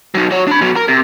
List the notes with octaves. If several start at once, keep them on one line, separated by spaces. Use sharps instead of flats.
F#3 D#4
F#4 C#5
D4 B5
B2 F#3
A#4
C3